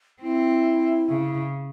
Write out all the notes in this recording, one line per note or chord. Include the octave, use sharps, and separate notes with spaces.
C4 E4
C#3